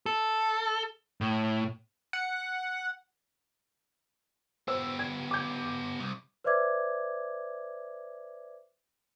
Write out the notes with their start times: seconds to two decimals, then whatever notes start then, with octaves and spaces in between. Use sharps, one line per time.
0.06 A4
1.21 A2
2.13 F#5
4.68 B3 G4 C5 E6
4.99 G#6
5.31 D6 G6
6.00 C2
6.44 B4 C5 D5 E5 D6 G#6